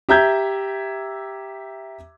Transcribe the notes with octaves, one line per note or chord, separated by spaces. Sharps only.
G4 E5 A#5 G6 G#6